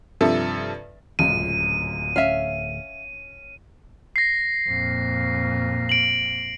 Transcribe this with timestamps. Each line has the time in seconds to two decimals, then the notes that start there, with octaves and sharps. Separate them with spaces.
0.21 G2 C3 F3 A4 E5
1.19 D1 C#2 F#2 A#2 D#7
2.16 C#4 E5 F5
4.16 A#6 C7
4.69 F2 A#2
5.89 D7 F#7